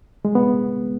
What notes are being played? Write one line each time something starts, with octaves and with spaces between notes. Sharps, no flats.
G#3
B3